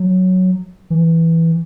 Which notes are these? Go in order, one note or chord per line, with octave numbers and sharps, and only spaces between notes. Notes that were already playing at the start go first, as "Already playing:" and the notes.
Already playing: F#3
E3